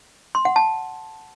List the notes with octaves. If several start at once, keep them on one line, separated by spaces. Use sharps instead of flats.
C6
F#5
A5